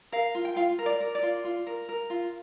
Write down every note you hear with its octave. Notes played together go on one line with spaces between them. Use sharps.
A#4 F5
F4
G5
F4 F5
A#4
D5
A#4
D5
F4
F4
A#4
A#4
F4